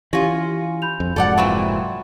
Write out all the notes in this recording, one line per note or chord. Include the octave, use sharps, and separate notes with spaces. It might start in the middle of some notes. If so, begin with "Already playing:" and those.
E3 C#4 F4 G4 A#6
B5 G6 F7
F2
F1 G#2 F#3 A4 D5 F#5
A#2 E3 C4 F#5 B5 C#6